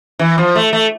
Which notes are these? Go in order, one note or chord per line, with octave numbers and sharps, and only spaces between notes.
E3
F3
A3
A3